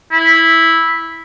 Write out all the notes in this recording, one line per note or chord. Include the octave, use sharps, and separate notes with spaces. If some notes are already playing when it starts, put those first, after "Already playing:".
E4